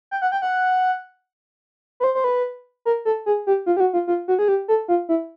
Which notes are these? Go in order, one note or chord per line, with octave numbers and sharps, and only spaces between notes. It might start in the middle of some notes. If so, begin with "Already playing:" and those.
G5
F#5
G5
F#5
B4
C5
C5
B4
A#4
A4
G#4
G4
F4
G4
F#4
F4
F4
F#4
G#4
G4
A4
F4
E4